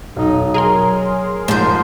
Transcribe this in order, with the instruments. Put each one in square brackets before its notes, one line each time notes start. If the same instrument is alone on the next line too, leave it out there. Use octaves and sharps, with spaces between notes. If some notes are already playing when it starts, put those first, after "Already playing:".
[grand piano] B1 [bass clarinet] D#4
[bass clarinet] F#3 [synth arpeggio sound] G#4 A#4 C6 [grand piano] A#5
[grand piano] G#2 [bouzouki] F3 C5